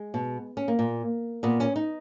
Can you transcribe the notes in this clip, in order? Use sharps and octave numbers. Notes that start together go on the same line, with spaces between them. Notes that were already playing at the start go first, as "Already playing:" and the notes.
Already playing: G#3
B2
C#4
A#3
A#2
A#2 B3
C#4
D#4